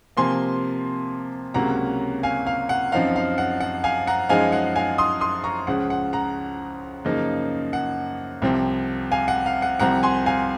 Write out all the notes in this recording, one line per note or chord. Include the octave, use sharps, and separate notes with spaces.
C3 F3 A#3 G#5 C6
C#2 C3 F#3 A#3 C#4 F#5 A#5
F5 G#5
F5
F#5
F#2 F3 C4 D#4 F5
F5
F#5
F#5
F5 G#5
F#5 A#5
F#2 F3 G#3 D#4 F5 G#5
F#5
F5 G#5
C6 D#6
C6 D#6
A#5 C#6
C#2 C#3 F3 F#5
F#5
F#5 A#5
F#2 C#3 F3 A#3 D#4
F#5
C2 C3 F3 C4
F5 G#5
F#5
F5
F#5
C2 C3 F3 F#5 A#5
G#5 C6
F5 G#5